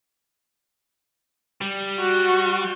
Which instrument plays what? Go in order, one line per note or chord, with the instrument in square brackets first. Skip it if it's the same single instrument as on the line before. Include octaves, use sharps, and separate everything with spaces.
[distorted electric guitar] G3
[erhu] F#4